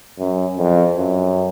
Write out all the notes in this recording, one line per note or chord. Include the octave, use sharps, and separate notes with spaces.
F#2
F2
F#2